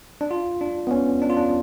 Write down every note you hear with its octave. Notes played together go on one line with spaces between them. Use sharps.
D4
F4
D4
B3
C#4
D4
F4
D4